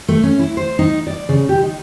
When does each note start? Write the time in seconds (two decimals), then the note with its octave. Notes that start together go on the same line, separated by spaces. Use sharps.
0.08 A3
0.23 C#4
0.39 E4
0.57 C5
0.79 D#4
1.07 D5
1.29 C#3
1.49 G4
1.63 D#4